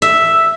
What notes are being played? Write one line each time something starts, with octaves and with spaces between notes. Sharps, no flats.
E5